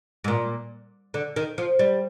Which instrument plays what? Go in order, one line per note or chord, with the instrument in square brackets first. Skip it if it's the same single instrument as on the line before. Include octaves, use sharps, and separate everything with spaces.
[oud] G#2
A#2
D3
D#3
F3
G3